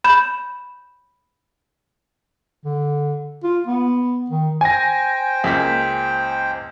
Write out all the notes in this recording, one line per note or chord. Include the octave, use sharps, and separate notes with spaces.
B5 G6 E7
D3
F4
B3
D#3
C5 G5 G#5 A#6
C#2 A#3 B6